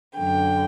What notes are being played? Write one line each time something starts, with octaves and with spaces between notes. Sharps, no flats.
F#2 D3 G5